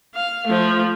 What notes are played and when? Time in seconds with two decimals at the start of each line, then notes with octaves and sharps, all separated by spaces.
0.15 F5
0.47 F3 A3